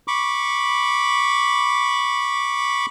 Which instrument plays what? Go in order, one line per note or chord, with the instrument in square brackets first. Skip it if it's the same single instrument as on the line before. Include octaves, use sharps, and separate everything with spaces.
[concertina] B5 C#6 D6